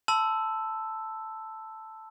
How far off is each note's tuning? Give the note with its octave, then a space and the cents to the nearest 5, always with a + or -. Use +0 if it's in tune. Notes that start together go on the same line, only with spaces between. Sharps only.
A5 +0 C6 -35 E6 +0